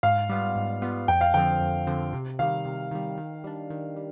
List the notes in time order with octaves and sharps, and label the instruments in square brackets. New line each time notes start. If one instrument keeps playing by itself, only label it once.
[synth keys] G#2 [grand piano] F5
[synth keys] G3 B3 F4
G#2
G3 B3 F4
[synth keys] F2 [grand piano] G5
[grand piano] F5
[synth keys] D3 F3 C4 [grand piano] G5
[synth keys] F2
D3 F3 C4
C3
[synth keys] D#3 G3 [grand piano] F5
[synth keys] C3
D#3 G3
D#3
G3 D4
D#3
G3